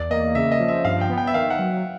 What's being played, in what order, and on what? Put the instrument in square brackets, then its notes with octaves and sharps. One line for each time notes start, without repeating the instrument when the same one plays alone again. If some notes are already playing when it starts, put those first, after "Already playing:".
Already playing: [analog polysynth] E2 [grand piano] D5
[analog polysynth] A#3 [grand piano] D#5
[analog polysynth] C#3 [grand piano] E5
[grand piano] D#5
[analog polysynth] F3
[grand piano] E5
[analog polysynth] G2 [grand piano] F5
[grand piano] G5
[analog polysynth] B3
[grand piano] G5
E5
[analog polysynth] D#3 [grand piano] F5
[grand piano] F#5
[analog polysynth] F#3